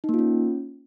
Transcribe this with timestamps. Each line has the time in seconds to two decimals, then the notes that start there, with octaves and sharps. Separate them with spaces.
0.04 D#4
0.09 A#3
0.14 F4
0.19 C#4